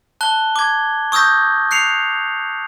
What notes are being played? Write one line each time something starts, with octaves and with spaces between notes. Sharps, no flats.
A5 F#6 G7
D6 G#6
C#6 D#6 E6 G6 A#6
F#6 C7 C#7 F7